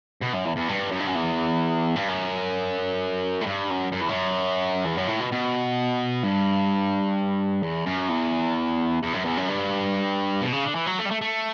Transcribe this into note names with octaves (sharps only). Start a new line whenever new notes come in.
B2
F#2
E2
E2
G2
F#2
G2
F#2
E2
G2
F#2
A2
G2
F#2
F#2
E2
F#2
E2
F#2
A2
B2
B2
G2
E2
F#2
E2
E2
F#2
E2
F#2
G2
B2
C#3
D3
E3
F#3
A3
G3
A3
A3